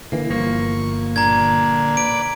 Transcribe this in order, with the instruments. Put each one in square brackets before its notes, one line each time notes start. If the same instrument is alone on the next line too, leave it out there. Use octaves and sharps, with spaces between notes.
[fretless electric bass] D3 E3 [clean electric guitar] A#3
[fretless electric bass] G1 [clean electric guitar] F3 A#3 [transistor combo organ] C#6
[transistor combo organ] A#2 D3 [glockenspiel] A#5 G#6
[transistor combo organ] B4 D5 [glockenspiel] D7